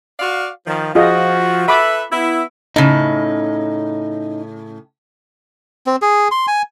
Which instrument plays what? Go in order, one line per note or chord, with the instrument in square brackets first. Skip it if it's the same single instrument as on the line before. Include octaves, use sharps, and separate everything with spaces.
[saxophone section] F#4 D5 F5
[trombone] D#3 [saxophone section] F3
[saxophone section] F3 [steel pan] F4 G#4 D#5 [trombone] F#4
[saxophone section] A4 B4 E5 [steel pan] B5 D6
[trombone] B3 [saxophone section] E4
[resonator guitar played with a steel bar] A2 C#3 [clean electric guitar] D#4
[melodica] C4
G#4
C6
G#5